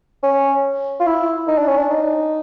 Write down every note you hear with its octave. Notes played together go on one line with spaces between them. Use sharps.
C#4
F4
E4
D#4
D4
C#4
D4
D#4